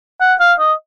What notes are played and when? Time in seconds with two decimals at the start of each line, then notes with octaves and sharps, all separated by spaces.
0.21 F#5
0.40 F5
0.60 D#5